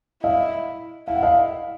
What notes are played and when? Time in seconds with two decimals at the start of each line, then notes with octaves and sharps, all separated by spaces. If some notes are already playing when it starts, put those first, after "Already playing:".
0.23 E4 D#5 F5
1.08 E4 F5
1.16 F#5
1.23 D#5 F5